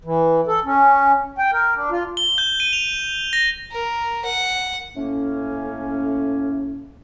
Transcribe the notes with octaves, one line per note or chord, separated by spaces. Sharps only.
E3
A4
C#4
G5
A#4
D4
F4
G7
G6
D#7
F7
A#6
A#4
F#5
A2 A3 A#3 C#4